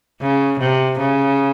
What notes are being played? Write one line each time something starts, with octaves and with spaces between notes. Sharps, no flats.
C#3
C3
C#3